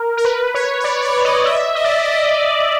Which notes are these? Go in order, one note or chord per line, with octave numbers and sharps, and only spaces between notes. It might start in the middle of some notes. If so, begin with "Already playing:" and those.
Already playing: A#4
A#4
B4
C#5
C#5
D5
C#5
D5
D#5
E5
D#5
D5
D#5
D5